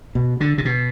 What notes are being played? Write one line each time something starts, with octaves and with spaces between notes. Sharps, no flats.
B2
D3
C3
B2